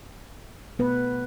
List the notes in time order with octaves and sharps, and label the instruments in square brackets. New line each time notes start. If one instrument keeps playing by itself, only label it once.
[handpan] B2 A3 B3 B4